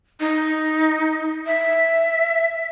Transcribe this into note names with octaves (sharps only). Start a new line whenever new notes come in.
D#4
E5